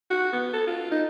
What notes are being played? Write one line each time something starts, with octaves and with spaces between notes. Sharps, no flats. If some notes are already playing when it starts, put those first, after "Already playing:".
F#4
B3
A4
F4
D#4